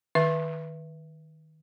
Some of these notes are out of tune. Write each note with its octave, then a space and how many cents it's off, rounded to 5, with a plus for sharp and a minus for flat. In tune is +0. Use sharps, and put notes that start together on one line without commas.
D#3 +0 E5 +15